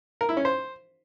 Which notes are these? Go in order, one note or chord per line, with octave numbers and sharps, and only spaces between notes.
A#4
E4
C#4
C5